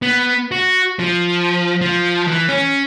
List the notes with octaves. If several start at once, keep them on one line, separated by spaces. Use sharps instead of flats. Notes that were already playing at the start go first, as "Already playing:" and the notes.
B3
F#4
F3
F3
E3
C#4